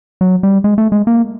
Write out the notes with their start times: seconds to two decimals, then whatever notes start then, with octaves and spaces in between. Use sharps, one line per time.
0.21 F#3
0.43 G3
0.64 G#3
0.78 A3
0.92 G#3
1.07 A#3